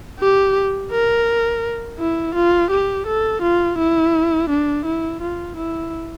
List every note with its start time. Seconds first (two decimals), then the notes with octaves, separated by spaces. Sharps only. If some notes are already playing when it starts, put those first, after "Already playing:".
0.20 G4
0.91 A#4
1.99 E4
2.35 F4
2.71 G4
3.07 A4
3.42 F4
3.78 E4
4.49 D4
4.85 E4
5.21 F4
5.57 E4